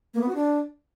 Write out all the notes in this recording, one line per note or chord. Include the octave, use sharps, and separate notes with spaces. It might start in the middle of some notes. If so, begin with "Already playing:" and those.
A#3
B3
F#4
D4